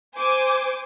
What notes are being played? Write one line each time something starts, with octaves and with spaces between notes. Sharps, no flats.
C5 G#5 D6